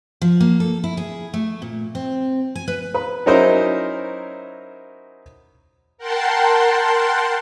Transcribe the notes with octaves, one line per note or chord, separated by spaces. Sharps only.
F3
A#3
A4
E4
G#4
A3
A#2
C4
G#5
B4
B4
F#3 C#4 D#4 E4 A#4 C5
A#4 F#5 G5 A5 C6